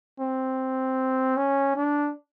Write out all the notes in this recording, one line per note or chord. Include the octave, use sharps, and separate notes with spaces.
C4
C#4
D4